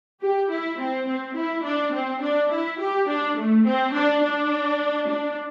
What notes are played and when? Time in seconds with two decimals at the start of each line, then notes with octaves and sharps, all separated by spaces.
0.21 G4
0.49 E4
0.79 C4
1.07 C4
1.35 E4
1.64 D4
1.93 C4
2.21 D4
2.50 E4
2.80 G4
3.08 D4
3.37 A3
3.65 C4
3.94 D4
4.22 D4
5.08 D4